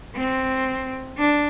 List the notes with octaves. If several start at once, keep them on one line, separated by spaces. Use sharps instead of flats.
C4
D4